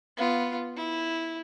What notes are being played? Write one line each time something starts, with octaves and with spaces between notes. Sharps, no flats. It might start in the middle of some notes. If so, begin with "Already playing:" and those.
B3 F4
E4